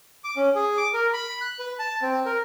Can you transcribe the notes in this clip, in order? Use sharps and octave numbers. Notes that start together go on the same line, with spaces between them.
D6
C#4
G#4
D6
A#4
B5
F#6
B4
A5
C4
A#4